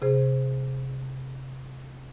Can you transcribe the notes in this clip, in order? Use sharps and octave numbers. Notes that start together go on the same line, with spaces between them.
C3 G#4 C5